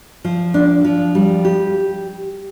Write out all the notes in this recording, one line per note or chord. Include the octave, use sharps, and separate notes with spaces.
F3
D4
F3
G3
G4